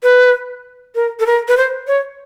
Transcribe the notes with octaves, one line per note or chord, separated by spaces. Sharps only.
B4
A#4
A4
A#4
B4
C5
C#5